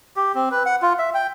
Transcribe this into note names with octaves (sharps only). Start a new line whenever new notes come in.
G4
C4
B4
F#5
F4
E5
G5